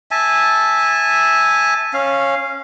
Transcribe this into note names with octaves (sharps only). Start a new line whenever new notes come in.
E5 G#5 A5
C#4 F5